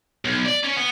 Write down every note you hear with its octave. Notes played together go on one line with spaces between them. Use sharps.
B1
D5
C#4
B3